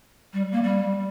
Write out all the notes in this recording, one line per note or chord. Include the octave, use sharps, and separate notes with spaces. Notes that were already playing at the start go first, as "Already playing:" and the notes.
G3
A#3
G3